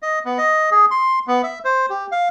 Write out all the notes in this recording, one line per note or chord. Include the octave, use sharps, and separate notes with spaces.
D#5
B3
D#5
G#4
C6
B3
E5
C5
G4
F5